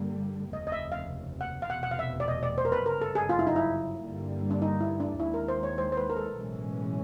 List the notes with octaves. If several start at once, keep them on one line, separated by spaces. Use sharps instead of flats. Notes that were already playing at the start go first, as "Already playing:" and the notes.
Already playing: G2 D3 G3 A#3
F1 D#2 C#3 D#5
D#5
E5
F5
F#5
F5
F1 E2 B2 F#5
F#5
F5
E5
D5
D#5
D5
C5
A#4
B4
G1 F#2 C#3 F#3 A#4
A4
G#4
F4
E4
D#4
E4
G2 D3 G3 A#3
D4
D#4
E4
D4
D#2 D#3 G#3 E4
A#4
C5
C#5
C5
C5
B4
A#4
A4
B1 A2 E3 G#3 C#4